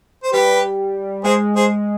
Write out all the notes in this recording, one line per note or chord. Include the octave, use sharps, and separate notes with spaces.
C5
G3 G4 B4
G#3 G#4 C5
G#4 C5